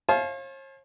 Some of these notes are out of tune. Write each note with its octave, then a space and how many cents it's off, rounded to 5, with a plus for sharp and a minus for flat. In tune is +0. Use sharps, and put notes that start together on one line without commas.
C#5 -45 F5 +0 A5 -40